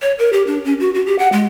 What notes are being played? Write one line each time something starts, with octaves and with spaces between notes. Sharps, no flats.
C#5
A#4
G4
D4
C#4
F#4
F#4
G4
F#5
G#3